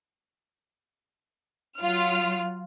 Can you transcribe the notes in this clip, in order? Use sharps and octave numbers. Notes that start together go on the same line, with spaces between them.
F#3 F4 F6